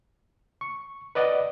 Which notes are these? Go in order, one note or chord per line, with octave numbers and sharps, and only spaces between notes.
C#6
B4 D5 D#5 F#5